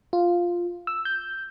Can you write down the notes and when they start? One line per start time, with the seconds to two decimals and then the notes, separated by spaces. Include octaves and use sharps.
0.13 F4
0.87 E6
1.05 G6